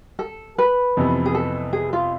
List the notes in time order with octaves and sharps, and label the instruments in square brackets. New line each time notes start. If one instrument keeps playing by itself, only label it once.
[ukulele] A4
B4
[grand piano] F2 C3 E3 B3
[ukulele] G#4
A4
G#4
F4